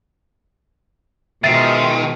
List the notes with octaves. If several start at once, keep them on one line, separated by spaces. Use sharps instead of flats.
B2 D#3 F3 G#3 E5 A6 C7